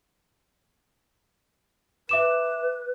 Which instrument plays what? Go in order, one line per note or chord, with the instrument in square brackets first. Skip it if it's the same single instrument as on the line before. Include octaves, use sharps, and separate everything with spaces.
[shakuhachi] B4 [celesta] E5 D6 E7